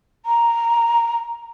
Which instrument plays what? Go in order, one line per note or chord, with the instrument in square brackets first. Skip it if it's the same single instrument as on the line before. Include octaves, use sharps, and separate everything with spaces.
[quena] A#5